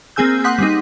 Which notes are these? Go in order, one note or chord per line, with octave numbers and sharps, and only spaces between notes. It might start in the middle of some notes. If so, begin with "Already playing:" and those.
A#3 C4 G#4 G#5 E6 G6
F#5 C6 D#6 F#6 G6 B6
G3 C4 D#4